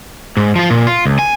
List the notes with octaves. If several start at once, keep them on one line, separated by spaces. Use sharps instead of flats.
G#2
F3 F4
A#2
F4
C#2
G#5